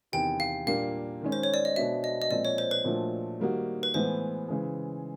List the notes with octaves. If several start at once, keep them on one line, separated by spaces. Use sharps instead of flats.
E2 C3 D#3 G5
F5
A#2 G3 A#3 D4 F5
D#3 G#3 C#4
C5
C#5
D5
D#5
B2 G#3 B3 D4 F#4 E5
D#5
D#5
A#2 F3 G#3 C4 D5
C#5
C5
B4
A#2 F3 A3 D4 F#4
D#3 G3 A#3 D#4 F#4
B4
A2 E3 G#3 B3 C5
C#3 E3 G#3